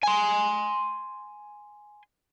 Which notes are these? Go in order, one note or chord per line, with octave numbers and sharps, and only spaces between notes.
G#5 C6